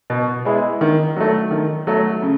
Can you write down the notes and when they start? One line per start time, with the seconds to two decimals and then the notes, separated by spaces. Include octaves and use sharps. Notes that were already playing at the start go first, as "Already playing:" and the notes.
0.10 B2
0.45 G#3 B3 E4 G#4
0.81 D#3
1.16 F#3 A3
1.51 D#3
1.87 F#3 A3
2.22 C#3